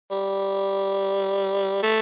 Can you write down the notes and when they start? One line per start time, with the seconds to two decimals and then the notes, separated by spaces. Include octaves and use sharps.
0.11 G3
1.83 A3